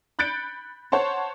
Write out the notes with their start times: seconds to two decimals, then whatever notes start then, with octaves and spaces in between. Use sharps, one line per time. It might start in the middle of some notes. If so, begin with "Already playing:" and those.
0.19 B5 F#6 G6 A6 C#7 D7
0.92 C5 C#5 F#5 A5 C6